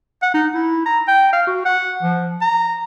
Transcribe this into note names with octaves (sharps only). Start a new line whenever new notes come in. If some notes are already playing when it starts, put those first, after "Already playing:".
F#5
D#4
E4
A#5
G5
F5
F#4
F#5
F3
A#5